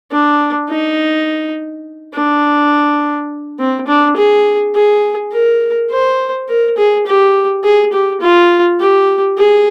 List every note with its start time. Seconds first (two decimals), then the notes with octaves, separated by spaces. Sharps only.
0.12 D4
0.69 D#4
2.15 D4
3.59 C4
3.87 D4
4.16 G#4
4.75 G#4
5.32 A#4
5.90 C5
6.49 A#4
6.77 G#4
7.06 G4
7.64 G#4
7.92 G4
8.21 F4
8.80 G4
9.37 G#4